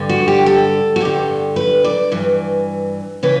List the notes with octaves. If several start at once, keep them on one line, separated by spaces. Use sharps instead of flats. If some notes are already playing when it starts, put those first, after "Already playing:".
Already playing: G2 D3
F#4
G4
A4
F#4
G2 D3 G4
B4
D5
G2 E3
C#3 E3 B4